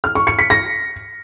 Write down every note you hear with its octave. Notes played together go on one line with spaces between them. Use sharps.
F6
C#6
C#7
B6
A#6